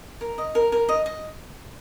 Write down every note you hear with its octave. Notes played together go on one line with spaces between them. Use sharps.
A#4
D#5
A#4
A#4
D#5
D#5